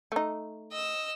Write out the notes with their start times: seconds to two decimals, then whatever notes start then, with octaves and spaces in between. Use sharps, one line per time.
0.12 A3 D#4
0.72 D#5 E6